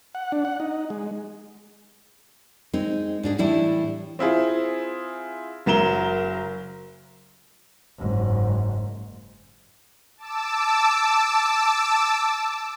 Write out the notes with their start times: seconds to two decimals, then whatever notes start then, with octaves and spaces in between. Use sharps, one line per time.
0.15 F#5
0.32 D4
0.45 F#5
0.60 D#4
0.90 G#3
2.73 G#3 C4 D#4
3.23 G#2 D4 G#4
3.38 A2 E3 G3 D4 E4
4.19 C4 E4 F4 G#4
5.66 F#1 F#3 A#4 E7 G7
7.98 F#1 G#2
10.17 A5 D6 E6